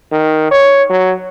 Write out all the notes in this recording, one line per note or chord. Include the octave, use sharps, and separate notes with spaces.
D#3
C#5
F#3